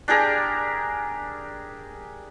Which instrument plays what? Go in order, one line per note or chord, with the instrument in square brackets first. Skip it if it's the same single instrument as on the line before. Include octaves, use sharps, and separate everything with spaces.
[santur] D4 G4 G#4 A#4